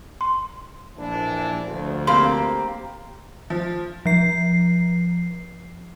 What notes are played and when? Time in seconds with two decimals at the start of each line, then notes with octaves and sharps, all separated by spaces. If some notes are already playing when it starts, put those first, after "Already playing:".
0.21 C6
0.98 A#1 E3 D4
1.66 D2 F3
2.07 A#3 C4 G4 F5 B5 C6
3.50 F3
4.06 F3 C7